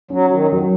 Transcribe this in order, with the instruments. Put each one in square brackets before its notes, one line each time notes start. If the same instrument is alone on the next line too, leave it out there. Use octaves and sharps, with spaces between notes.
[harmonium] F#3 [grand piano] C#4
[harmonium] D#3
[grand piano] F#3